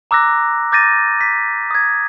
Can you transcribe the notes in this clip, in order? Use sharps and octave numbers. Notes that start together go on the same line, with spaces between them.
A#5 D6 E6 F#6 A#6
D6 G6 A6 A#6 D#7
B6
D#6 G#6